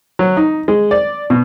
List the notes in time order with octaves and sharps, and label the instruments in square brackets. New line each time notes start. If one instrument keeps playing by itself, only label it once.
[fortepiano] F#3
D#4
G#3
D5
B2